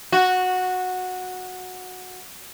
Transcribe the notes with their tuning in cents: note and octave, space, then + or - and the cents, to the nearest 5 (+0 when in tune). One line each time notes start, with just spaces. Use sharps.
F#4 -10